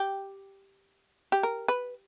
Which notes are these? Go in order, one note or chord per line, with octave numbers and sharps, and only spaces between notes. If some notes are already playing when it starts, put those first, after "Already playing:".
Already playing: G4
G4
A#4
B4